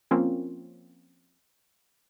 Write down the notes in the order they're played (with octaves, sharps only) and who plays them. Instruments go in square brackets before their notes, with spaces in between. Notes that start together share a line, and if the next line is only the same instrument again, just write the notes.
[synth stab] F3 A#3 C4 C#4